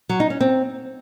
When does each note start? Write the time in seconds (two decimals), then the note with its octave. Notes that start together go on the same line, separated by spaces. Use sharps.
0.09 F#3
0.20 D#4
0.30 C#4
0.41 C4